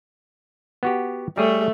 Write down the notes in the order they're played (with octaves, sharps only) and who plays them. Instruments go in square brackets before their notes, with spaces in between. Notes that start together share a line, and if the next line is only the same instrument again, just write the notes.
[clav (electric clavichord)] B3 F#4 G4
[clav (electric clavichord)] G3 G#4 C#5 [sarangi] A3